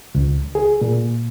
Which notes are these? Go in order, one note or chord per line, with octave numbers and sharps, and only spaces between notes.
C#2
G#4
A#2